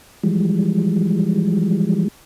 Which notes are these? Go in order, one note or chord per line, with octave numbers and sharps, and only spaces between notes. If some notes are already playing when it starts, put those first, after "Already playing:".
E3 F3 G3 G#3